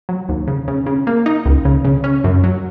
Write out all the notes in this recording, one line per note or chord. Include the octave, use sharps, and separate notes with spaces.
F#3
D#2
C#3
C#3
C#3
A#3
D#4
C#2
C#3
C#3
C#4
F#2
F#3